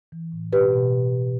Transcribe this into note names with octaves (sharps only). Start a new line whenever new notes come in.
E3
A2
B2 G4 B4
B2